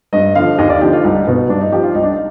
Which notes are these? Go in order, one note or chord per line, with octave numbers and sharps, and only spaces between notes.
G2 D#5
D3 F3 F5
D#2 D#5
D5
D3 F3 G4
F4
C2 D#4
B2
G2 D4
D#4
F3 G4
F4
C2 D#4
D4
D#4